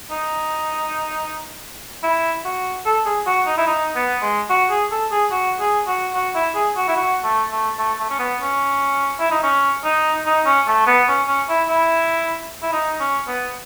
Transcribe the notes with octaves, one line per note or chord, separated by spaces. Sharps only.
D#4
E4
F#4
A4
G#4
F#4
D#4
E4
D#4
B3
G#3
F#4
G#4
A4
G#4
F#4
G#4
F#4
F#4
E4
G#4
F#4
E4
F#4
A3
A3
A3
A3
C#4
B3
C#4
E4
D#4
C#4
D#4
D#4
C#4
A3
B3
C#4
C#4
E4
E4
E4
D#4
C#4
B3